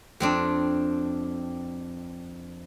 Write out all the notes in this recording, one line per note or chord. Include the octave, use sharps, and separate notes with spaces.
F2 C4 D4